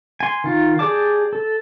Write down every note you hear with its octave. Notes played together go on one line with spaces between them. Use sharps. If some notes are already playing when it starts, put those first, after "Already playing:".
G#5 C6
D#3 F4
G4 G#4 D5 A5 D6
A4